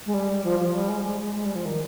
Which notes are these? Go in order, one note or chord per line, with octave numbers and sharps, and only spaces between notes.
G#3
G3
F3
F3
G3
G#3
G#3
G#3
G#3
G3
F3
D#3